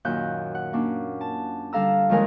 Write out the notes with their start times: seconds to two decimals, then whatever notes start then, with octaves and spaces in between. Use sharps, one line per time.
0.05 F#2 A#2 D#3 F#6 G6
0.55 F#5
0.73 A#3 C#4 D4
1.21 A5
1.73 D3 G3 A4 F5 A#5 E6
2.09 D#2 D#3 F3 G#3 A#4 G#5